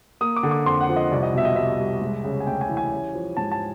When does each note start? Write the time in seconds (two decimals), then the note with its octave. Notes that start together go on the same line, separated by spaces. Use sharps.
0.21 A#3 D#6
0.36 D6
0.43 D3
0.51 D6
0.66 F2 C6
0.81 F#5
0.89 F3
0.96 D#5
1.11 C2 D5
1.23 D#5
1.34 B2 E5
1.45 D#5
1.56 C2 E5
1.79 G3
2.01 G#3
2.24 C#3
2.40 G#5
2.47 D2 G5
2.61 G#5
2.69 E3
2.77 G#5
2.91 C#4
3.15 F3
3.37 G#2 A5
3.52 A5